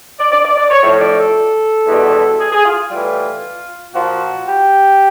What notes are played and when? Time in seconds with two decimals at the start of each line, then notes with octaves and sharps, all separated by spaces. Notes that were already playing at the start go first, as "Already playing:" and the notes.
0.19 D5
0.32 D5
0.45 D5
0.57 D5
0.71 C#5
0.83 A2 F3
1.01 D5
1.19 A4
1.88 E2 B2 G3
2.40 G#4
2.52 G#4
2.65 F4
2.78 F4
2.91 A2 E3 G3
3.95 A#2 F3 F#4
4.47 G4